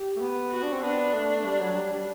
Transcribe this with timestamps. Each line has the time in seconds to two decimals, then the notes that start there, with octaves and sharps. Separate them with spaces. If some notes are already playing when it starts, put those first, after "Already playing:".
Already playing: G4
0.16 A3
0.21 B3
0.51 F#4
0.63 D4
0.72 C4
0.82 B3 D4
1.14 A3
1.45 G3
1.61 F#3
1.76 G3
1.92 G3